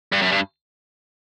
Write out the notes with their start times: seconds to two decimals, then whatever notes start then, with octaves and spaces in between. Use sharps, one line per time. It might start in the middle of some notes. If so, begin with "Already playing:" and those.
0.12 G2
0.22 F#2
0.32 G2